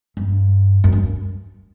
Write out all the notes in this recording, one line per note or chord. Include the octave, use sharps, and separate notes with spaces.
G2
F#2
G2